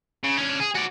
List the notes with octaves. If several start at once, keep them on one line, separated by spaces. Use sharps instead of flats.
C#3
C#4 D4
G#4
F#4 D5